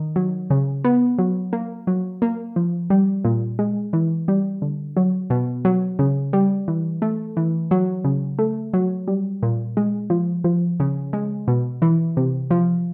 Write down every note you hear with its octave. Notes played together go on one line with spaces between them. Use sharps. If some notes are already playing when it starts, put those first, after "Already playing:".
Already playing: D#3
F#3
C#3
B3
F#3
A#3
F#3
A#3
F3
G3
A#2
G#3
E3
G3
D3
F#3
B2
F#3
C#3
G3
E3
A3
E3
F#3
C#3
A3
F#3
G3
A#2
G#3
F3
F3
C#3
G#3
B2
E3
C3
F3